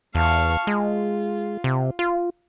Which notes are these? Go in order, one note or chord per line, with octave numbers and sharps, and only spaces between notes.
E2 F5 A5 C#6
G#3 F4
C3
F4